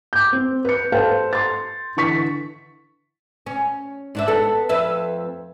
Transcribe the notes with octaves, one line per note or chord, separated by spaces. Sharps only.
D6 G6
C4
B4 C#7
A4 B4 C5 F5 G5 A5
C6 A6
D3 E3 C#6 B6
C#4
G#2 D4 E5
B3 A4
F2 B4 E5